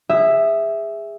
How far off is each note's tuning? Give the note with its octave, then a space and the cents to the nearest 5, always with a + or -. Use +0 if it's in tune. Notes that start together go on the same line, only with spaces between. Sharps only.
G#4 -20 E5 +0